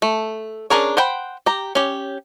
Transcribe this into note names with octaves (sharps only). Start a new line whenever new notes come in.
A3
C#4 D4 G#4 A#4 C#5
C5 F#5 G5 B5
G4 A#5
C#4 G4